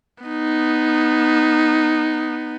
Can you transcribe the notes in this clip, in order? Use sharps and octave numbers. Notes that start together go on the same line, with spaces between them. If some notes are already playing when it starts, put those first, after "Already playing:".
B3 D#4